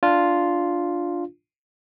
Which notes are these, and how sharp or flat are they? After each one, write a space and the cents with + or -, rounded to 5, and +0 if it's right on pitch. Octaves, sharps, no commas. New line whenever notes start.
D4 +0 F4 +0